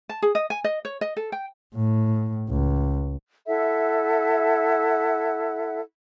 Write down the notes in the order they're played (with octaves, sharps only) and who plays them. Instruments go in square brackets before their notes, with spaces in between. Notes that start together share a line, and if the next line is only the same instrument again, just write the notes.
[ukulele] A5
G#4
D#5
G#5
D#5
C#5
D#5
A4
G5
[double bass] A2
C#2
[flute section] E4 A4 E5 F#5